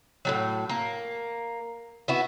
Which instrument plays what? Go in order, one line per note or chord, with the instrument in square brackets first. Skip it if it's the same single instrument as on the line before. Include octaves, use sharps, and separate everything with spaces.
[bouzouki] A2 C3 F#3
A#3
B3 E4 F#4